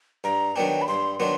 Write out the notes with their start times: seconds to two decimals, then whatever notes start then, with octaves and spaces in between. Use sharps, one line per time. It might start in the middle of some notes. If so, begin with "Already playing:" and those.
0.24 G2 A#5
0.56 D#3 F#3 B3 D4 G5
0.82 B5
0.88 G2 C6
1.20 D#3 F#3 B3 D4 C6